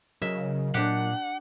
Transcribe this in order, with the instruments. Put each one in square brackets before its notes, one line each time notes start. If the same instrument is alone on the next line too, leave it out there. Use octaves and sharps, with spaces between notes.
[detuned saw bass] C#3 [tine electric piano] F#3 A#4 D#5 [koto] E5
[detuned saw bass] A#2 [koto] D4 G4 [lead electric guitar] F#5